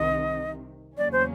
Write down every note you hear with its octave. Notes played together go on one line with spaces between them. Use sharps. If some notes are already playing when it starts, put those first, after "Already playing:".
Already playing: C2 C3 D#3 D#5
E2 C#3 F#3 A#3 C#4 D5
C5